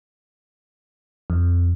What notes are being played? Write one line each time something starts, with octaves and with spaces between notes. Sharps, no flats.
F2